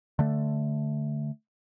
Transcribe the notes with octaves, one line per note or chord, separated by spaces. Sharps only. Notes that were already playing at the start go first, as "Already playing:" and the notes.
D3 A3